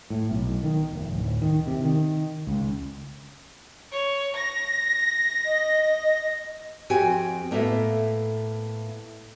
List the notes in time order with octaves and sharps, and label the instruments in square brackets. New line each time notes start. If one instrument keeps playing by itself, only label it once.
[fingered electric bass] A2
B1
D#3
F1
D1
D#3
C3
D#3
C#2
[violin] C#5
A#6
[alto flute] D#5
[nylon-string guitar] F2 C4 F#4 G4 G5 G#5
A2 A#3 B3 A4 E5